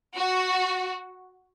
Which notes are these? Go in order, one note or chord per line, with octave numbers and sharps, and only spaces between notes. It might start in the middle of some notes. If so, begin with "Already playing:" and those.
F#4